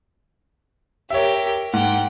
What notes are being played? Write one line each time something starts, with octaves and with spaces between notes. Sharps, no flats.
G4 A#4 C#5 E5
G#2 F#5 G5